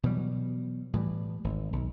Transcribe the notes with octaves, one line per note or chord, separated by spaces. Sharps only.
B2 E3 F#3 G3
A2 E3 G3
G#1
B1